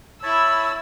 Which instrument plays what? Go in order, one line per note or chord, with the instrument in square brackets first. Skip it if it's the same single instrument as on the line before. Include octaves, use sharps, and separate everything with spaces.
[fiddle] E4 B5 [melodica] C#5 A5 [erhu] E6